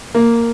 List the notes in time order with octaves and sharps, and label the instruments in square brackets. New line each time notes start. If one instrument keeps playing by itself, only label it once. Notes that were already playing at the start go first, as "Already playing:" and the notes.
[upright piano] A#3